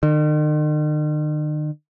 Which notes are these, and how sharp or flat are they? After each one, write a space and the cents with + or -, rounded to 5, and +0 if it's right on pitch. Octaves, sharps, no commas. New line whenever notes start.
D#3 -45